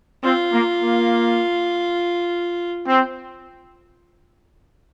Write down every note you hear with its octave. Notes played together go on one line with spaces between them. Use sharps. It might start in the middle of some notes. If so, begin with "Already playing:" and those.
C4 F4
A#3
A#3
C4